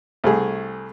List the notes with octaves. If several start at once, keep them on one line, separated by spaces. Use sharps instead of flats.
C2 A3 G#4